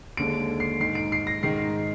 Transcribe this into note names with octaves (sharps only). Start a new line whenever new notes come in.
D#2 D3 G#3 D7
C7
G#2 D#3 G#3 C7
D7
C7
A#6
G#2 D#3 G#3 C7